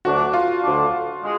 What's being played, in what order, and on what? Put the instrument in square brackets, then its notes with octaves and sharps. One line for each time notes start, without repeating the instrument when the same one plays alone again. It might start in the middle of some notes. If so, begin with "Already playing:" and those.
[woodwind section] D2 D3 F#3 D4 [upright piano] F#4
[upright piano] F4
[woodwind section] D2 D3 F#3 D4
G#3